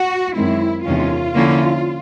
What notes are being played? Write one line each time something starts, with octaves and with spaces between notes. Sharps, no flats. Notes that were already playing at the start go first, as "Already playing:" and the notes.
Already playing: F#4
F#2 D#3 G#3 C4 E4
E2 C3 D#3 G#3 C#4 F4
D3 F3 A#3 C#4 E4